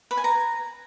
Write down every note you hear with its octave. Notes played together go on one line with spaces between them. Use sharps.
B4
G#5
A#5